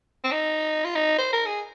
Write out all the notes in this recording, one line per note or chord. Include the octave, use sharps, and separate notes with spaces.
C4
D#4
F4
D#4
C5
A#4
G#4